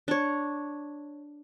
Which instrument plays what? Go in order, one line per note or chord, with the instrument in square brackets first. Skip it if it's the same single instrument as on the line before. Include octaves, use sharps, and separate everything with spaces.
[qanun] D4 C#5